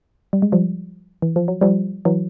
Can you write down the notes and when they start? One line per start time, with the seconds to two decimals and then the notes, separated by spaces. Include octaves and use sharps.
0.33 G3
0.42 G#3
0.52 F3 G3
1.22 E3
1.36 F3
1.48 F#3
1.61 F3 G3
2.05 E3 F#3